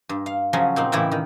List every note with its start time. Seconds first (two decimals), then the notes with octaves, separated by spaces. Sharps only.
0.09 G2
0.26 F5
0.53 C#3 F3 F#3 C#4
0.76 A#2 C4 D#4
0.92 A2 C#3 E3 E4 G4
1.11 D#3